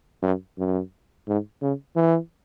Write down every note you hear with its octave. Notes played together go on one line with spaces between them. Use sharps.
F#2
F#2
G#2
C#3
E3